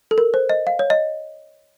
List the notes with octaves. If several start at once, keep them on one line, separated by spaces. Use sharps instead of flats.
A4
A#4
C5
D#5
F5
C#5
D#5